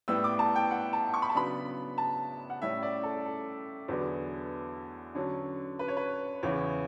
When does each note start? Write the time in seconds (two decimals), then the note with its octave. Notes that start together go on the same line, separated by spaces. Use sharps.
0.08 A2 G3 B3 E6
0.24 D6
0.39 A5
0.56 G5
0.71 F#5
0.93 A5
1.14 C#6
1.22 B5
1.30 A5
1.35 C#3 F#3 B3 D4 B5
1.98 A5
2.50 F#5
2.62 A2 G3 C#4 E5
2.83 D5
3.03 A4
3.26 A4
3.88 E2 D3 F#3 B3 D4
5.15 D3 F#3 C#4
5.79 B4
5.88 C#5
5.97 B4
6.43 E2 C#3 E3 C#5